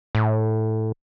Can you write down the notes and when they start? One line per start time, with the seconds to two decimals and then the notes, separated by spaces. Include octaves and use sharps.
0.15 A2